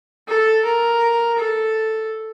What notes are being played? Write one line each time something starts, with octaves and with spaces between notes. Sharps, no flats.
A4
A#4
A4